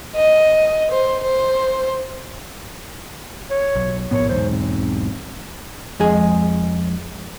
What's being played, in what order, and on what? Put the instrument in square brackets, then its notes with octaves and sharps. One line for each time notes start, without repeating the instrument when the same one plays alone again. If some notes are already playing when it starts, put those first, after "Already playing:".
[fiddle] D#5
C5
C5
[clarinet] C#5
[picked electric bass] B1
[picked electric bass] A#1 A2 B3 [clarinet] C#5
[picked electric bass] B1 E2 G#2 [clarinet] C5
[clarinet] C4
[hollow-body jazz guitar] F2 G#3 G#4